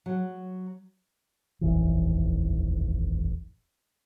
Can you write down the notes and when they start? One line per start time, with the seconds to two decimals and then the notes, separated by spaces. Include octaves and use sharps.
0.06 F#3
1.61 D#1 A1 F2 E3